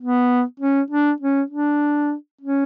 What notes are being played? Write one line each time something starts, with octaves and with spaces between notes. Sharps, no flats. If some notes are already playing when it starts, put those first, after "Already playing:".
B3
C#4
D4
C#4
D4
C#4